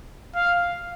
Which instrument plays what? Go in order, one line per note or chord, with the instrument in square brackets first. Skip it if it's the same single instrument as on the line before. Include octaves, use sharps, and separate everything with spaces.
[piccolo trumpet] F5